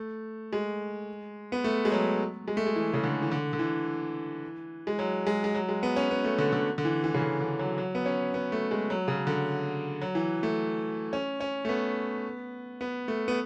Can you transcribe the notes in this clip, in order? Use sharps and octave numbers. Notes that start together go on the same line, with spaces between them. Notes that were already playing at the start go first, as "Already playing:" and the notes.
Already playing: A3
G#3
B3
A3
G#3
F#3
G#3
A3
G#3
E3
C#3
D3
E3
D3
D3
E3
G#3
F#3
G#3
G#3
F#3
G#3
B3
C#4
B3
A3
D3
D3
D3
E3
E3
C#3
D3
D3
F#3
F#3
B3
C#4
B3
A3
G#3
F#3
C#3
D3
F#3
E3
A3
C#4
C#4
A3
B3
B3
A3
B3